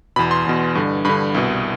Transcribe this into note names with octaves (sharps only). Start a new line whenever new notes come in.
E2 B2 B5
C6
E2 B2
G2 D3
G2 D3 B5
C2 B2